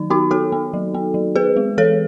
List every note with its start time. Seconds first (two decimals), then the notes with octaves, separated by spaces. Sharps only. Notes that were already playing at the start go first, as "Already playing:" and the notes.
Already playing: D#3 F#3 D#4
0.10 B3 D#4 F#4
0.31 B3 F#4 A4
0.52 B3
0.74 F#3
0.94 B3
1.14 F#3
1.36 B3 G#4 B4
1.56 G#3
1.78 E3 A4 C#5